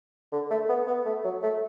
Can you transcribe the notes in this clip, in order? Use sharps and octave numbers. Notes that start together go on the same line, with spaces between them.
D3
A3
B3
B3
A3
F#3
A3